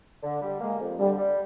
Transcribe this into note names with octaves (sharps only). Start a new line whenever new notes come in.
D3
G3
G#3 A#3
F2
D3 G3
G3